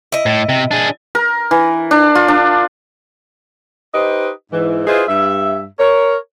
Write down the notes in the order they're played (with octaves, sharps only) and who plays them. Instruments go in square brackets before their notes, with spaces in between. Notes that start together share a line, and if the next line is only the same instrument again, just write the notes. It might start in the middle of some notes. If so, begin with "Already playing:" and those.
[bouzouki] E4 D#5
[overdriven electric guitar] A2
C3
D4 G#4
[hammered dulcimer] A#4
E3
D4
F4
D4
[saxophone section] D#4 G4 B4 C5 D#5
G#2 E3
E4 F4 G#4 B4 C5 D#5
G2 E5
A#4 C#5